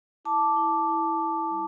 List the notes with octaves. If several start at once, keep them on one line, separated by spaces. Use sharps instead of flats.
E4 A5 D6
E4
E4
E4
G3